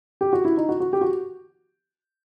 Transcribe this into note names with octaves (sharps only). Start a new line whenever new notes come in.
G4
F#4
E4
D#4
F#4
F#4
G4
F#4